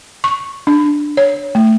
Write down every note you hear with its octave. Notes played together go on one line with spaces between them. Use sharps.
C#6
D4
C#5
A3